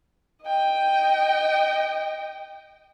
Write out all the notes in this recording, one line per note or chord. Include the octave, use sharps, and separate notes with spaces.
D#5 G5